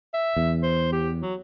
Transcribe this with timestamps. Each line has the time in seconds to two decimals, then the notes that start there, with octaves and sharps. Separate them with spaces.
0.14 E5
0.36 E2
0.63 C5
0.92 G4
1.21 F#3